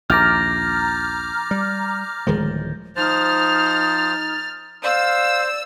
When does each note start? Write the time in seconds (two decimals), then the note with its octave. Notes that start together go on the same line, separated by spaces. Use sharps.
0.10 A#1 D#2 A#5 D6 F6 G6 A6 A#6
1.51 G3
2.27 D1 D#3 F3 G#3
2.96 F3 D#4 C5 F6 A6
4.83 C5 D5 F5 E6